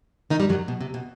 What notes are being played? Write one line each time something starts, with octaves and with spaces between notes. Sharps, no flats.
D#3 D#4
G2 G3
F#2 F#3
B2
C3
B2